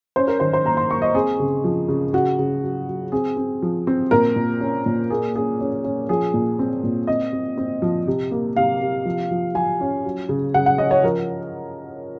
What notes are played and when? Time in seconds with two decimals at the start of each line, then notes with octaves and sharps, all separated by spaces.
0.16 C#4 C5
0.28 A#4
0.40 D#3 C5
0.53 C5
0.65 A#3 A#5
0.77 C6
0.91 A#3 C#6
1.02 D#5
1.14 C4 G#4
1.39 C#3
1.64 F3
1.88 C#3
2.13 C#3 F#4
2.39 C#3
2.63 F#3
2.88 F#3
3.12 C4 G#4
3.37 C4
3.62 F3
3.87 C4
4.11 A#2 A#4
4.36 A#2
4.61 C#4
4.86 A#2
5.10 A#3 G#4
5.36 C#4 G#4
5.60 C#4
5.84 C#4
6.09 F3 G#4
6.34 A#2
6.59 C4
6.83 A#2
7.07 C4 D#5
7.33 C4
7.58 C4
7.82 F3
8.07 C3
8.31 A#3
8.56 C3 F5
8.81 C3
9.05 F3
9.31 F3
9.55 F3 G#5
9.81 C#4
10.04 F#3
10.29 C#3
10.54 C#3 F#5
10.66 F#5
10.78 C#4 D#5
10.91 C#5
11.03 F3 A#4